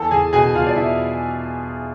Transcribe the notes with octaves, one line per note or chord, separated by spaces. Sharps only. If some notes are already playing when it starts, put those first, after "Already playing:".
Already playing: E2 A4 A5
E2 G#4 G#5
B2 G#4 G#5
B2 F4 F5
D5
E2 E4 E5